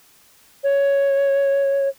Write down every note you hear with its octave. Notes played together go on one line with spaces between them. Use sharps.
C#5